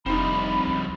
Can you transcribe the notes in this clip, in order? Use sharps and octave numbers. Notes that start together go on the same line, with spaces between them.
F1 F3 G3 C4 D4 D#4 B5
C#2